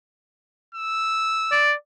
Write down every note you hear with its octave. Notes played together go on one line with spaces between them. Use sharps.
E6
D5